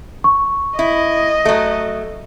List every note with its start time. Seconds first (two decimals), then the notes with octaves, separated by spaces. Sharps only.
0.24 C#6
0.79 E4 D#5
1.45 F#3 A3